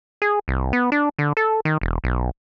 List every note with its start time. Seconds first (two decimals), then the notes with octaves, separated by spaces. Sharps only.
0.22 G#4
0.48 C2
0.73 B3
0.92 D4
1.19 D3
1.37 A4
1.65 D#3
1.81 E1
2.04 B1